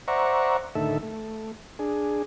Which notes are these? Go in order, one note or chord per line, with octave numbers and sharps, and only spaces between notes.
C5 D5 E5 F#5 A#5 C#6
D2 A2 D#3 A4 E5
A3
D4 G#4